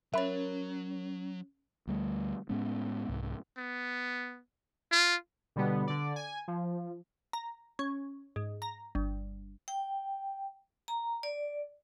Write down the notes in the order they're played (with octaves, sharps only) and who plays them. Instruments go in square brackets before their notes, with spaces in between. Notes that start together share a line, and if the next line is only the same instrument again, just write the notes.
[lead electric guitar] F#3 [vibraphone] C#4 [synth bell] A#4 C#5 [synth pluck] E5 B5
[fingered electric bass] D2 G3 A3
A2 G#3 B3 C#4
C2 G#2
[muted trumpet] B3
F4
[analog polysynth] B2 D3 G3 B3
D3 D5
G#5
F3
[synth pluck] A#5
C#4
G#2
A#5
G1
[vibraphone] G5
A#5
D5